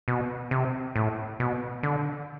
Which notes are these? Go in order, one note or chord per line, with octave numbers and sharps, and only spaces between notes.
B2
C3
A2
B2
D3